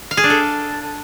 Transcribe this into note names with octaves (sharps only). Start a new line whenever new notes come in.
F5
G#4
D4
A4